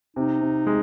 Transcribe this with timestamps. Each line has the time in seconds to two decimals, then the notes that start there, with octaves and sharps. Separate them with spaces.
0.16 C3 D#4
0.41 C3
0.67 G#3